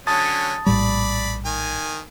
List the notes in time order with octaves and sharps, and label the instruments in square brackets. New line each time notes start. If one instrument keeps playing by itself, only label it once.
[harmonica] D3 F#3 C#4 [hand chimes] A5 D#6 A6
[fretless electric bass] A#1 A2 G3 [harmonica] D5 B5
[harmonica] D#3 G#5